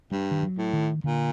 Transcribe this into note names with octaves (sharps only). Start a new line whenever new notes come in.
G2 G3
D#3
F#3
A2
D#3
A#2 D3